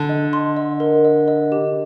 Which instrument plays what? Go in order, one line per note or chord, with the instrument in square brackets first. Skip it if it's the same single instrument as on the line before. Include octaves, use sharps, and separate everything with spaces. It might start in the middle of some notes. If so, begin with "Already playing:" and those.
Already playing: [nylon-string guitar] D3
[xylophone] D#5
C6
D#5
A#4
D#5
D#5
G4